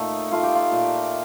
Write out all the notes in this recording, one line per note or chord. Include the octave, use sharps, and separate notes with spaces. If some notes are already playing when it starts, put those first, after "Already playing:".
Already playing: A#2 A3 D#4
A3 F4
G4
F4
A#2